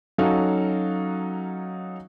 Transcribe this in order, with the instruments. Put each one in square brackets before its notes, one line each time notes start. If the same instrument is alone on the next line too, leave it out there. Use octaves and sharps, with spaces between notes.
[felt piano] F#3 C#4 D#4 F#4 A4 F5